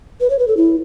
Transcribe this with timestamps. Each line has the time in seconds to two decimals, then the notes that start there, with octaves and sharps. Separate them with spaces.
0.21 B4
0.30 C#5
0.39 B4
0.48 A4
0.57 E4